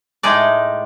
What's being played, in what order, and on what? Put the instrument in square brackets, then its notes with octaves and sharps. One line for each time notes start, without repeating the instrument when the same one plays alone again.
[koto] A2 G#3 D#4 D5